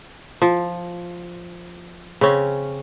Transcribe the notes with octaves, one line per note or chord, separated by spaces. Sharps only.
F3
C#3 C4 C#4